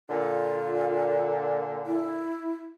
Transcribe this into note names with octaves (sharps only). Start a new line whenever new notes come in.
A#2 D3 F4
E4